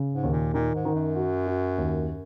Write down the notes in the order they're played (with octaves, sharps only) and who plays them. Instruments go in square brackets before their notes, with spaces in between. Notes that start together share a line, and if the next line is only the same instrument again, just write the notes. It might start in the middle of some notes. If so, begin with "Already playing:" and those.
Already playing: [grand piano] C#3
[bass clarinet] G#2
[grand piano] D#2
[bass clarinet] A#2
[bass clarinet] A#2 [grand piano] D#3
[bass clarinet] G#2
[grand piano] D#3
[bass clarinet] F#2
[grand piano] F#4
F#4
D#2